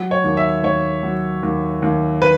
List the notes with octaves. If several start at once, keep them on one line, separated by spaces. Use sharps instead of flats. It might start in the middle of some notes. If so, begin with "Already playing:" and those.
Already playing: F#3
C#5
D#2
E5
D#2 C#5
F#3
D#2
D#2
B4